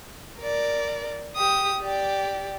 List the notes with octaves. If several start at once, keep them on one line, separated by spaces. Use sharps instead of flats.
A#4 D5
G4 D#6
G4 D5